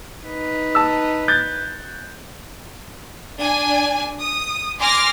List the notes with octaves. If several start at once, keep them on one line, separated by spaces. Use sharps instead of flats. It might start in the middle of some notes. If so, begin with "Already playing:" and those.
D#4 B4
A5 E6
F#6 G6 A6
D4 G#5
D#6
G#5 C6 D6 F6 A#6